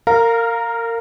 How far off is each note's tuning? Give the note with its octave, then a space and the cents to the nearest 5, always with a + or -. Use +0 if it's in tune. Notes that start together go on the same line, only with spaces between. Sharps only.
A#4 -25 F5 +5 A#5 +0